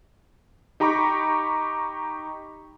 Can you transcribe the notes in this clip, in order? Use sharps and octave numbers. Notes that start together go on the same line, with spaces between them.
D#4 G4 A#5 B5 C#6 D6